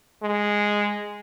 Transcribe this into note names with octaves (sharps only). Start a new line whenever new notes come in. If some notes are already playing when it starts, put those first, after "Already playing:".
G#3